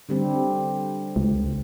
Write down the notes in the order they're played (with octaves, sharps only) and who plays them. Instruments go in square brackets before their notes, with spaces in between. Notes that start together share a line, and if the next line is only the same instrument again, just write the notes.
[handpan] D3 G3 C4
[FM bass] C#2